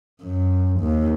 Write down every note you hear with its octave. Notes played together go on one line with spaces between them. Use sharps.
F#2
D#2